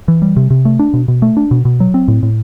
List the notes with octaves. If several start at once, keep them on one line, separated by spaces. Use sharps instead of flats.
E3
G3
C3
C3
A3
D4
B2
B2
A3
D4
B2
B2
F#3
C4
A2
A2